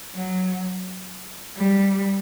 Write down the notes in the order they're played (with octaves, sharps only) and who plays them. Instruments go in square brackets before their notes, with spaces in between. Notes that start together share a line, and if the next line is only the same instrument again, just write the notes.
[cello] F#3
G3